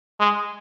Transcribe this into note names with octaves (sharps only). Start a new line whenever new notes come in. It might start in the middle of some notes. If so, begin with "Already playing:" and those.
G#3